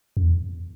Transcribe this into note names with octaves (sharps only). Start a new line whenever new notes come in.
F#2
E2